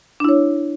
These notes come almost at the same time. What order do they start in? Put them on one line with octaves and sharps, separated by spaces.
D4 E4 C#5